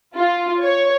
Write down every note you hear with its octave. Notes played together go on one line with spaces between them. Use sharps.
F4
C#5